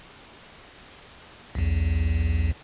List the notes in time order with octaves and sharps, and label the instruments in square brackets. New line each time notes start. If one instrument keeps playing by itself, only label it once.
[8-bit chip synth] B1 E2